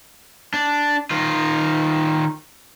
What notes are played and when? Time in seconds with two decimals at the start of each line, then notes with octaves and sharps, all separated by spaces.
0.54 D4
1.11 D#3 F4